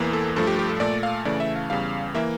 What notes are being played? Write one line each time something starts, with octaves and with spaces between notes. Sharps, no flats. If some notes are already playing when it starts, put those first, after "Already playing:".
Already playing: E2 E3 A#3
A4
G2 F3 A3 A4
G4
G4
A4
A#2 A3 D5
F5
C#3 E3 A3 D5
E5
F5
E2 C#3 G3 F5
E3 A#3 E5